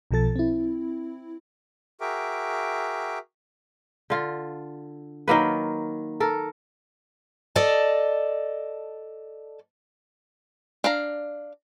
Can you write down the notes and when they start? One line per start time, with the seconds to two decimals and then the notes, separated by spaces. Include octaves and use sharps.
0.11 B1 B2 F3 A4 A6
0.36 C4 E4
2.01 F#4 G#4 A#4 E5 G5 D6
4.10 D3 F4
5.28 D#3 F#3 A#3 B4
6.20 A4 A#4
7.56 A4 D5 D#5 A5
10.84 D4 F5 A#5